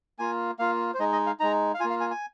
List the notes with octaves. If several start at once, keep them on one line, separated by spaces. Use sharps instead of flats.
A#3 F4 G#5
A#3 F4 F5
C5
G#3 D#4 D#5
D#5
F5
G#3 D#4 A#5
F5
A#3 F4 G#5
F5
G#5
G#5